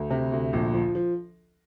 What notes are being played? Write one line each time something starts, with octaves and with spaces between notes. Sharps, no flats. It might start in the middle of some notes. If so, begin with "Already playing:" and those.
Already playing: D2
C3
D2
A#1
F3
F3